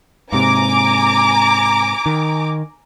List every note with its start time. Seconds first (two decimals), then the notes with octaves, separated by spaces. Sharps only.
0.33 G#2 C3 G#5 A#5 D6
2.06 D#3